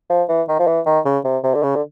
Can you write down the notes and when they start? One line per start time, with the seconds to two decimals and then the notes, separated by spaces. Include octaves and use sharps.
0.10 F3
0.29 E3
0.49 D#3
0.59 F3
0.67 E3
0.86 D#3
1.05 C#3
1.24 C3
1.44 C3
1.55 D3
1.63 C#3
1.76 D3